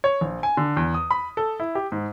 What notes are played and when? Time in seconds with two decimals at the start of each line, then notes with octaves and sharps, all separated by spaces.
0.04 C#5
0.21 A#1
0.43 G#5
0.57 D3
0.77 E2
0.94 D#6
1.11 B5
1.37 A4
1.60 E4
1.75 G4
1.92 G#2